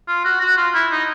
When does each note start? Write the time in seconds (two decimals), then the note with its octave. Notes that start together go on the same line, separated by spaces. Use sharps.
0.08 F4
0.25 F#4
0.41 F#4
0.57 F4
0.74 E4
0.92 D#4